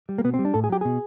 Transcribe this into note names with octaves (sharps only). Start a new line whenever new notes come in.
G3
A#3
B2 B3
C4
G3
D4
A2 A4
G#4
F#3 G4
B2 G#4